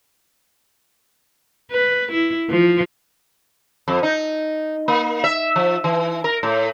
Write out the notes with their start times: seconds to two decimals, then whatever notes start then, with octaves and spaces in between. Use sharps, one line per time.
1.71 B4
2.12 E4
2.50 F3
3.88 F2
4.03 D#4
4.88 A#3
5.24 E5
5.56 F3
5.84 E3
6.24 A#4
6.43 A2